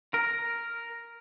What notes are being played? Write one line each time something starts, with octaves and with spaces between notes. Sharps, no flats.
A#4